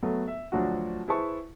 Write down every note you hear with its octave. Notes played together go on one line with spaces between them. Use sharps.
F#3 A3 B3
E5
D2 F3 F#3 D4 F4 F#4
E4 G#4 B4 C5 A5 C#6